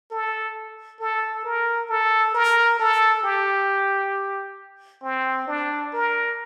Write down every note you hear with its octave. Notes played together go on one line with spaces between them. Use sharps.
A4
A4
A#4
A4
A#4
A4
G4
C4
D4
A#4